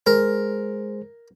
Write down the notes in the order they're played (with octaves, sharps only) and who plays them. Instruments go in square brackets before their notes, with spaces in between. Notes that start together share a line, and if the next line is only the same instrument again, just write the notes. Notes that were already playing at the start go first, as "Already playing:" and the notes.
[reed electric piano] G#3 G#4 C5 [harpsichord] A#4